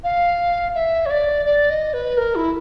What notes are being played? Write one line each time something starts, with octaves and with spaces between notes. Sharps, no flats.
F5
E5
C#5
D5
D5
D#5
B4
A#4
E4